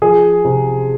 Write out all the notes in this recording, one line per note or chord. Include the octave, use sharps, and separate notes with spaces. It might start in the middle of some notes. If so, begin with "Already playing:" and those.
F3 G#4
C3